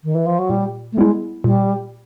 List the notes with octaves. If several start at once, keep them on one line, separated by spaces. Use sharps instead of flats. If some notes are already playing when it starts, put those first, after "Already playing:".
D#3
E3
F3
F#3
A#2 G3
A3
G3 G#3 B3 E4
A#2 G3